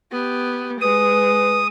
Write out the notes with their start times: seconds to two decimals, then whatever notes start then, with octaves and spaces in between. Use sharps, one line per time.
0.12 B3 G4
0.81 G#3 B4 D#6